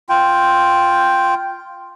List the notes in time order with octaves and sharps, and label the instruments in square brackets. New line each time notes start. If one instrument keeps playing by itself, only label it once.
[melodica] F4 G5